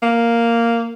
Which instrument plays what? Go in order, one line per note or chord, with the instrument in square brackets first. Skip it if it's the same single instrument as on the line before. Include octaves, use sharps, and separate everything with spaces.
[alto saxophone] A#3